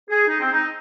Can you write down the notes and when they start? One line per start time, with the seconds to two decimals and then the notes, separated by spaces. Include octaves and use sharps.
0.09 G#4
0.27 D#4
0.40 C4
0.52 D#4